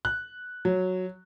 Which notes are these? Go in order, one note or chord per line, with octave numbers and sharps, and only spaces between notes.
F#6
F#3